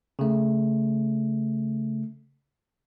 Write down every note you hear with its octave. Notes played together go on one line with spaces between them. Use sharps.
C#3 A3